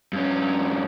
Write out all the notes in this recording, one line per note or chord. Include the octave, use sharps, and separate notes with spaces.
G2 C#4